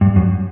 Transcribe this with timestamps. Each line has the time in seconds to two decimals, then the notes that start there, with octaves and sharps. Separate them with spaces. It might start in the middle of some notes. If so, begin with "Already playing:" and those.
0.01 G2
0.16 F#2